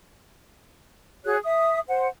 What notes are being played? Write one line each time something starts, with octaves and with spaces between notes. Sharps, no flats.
F#4 G#4 C#5 F#6
E5 D#6
C5 F#5